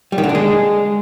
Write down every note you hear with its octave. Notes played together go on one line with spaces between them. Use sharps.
G3
D#3
D3
D4
G#3